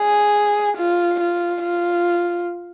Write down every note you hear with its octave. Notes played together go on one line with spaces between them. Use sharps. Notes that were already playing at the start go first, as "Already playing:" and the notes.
Already playing: G#4
F4
F4
F4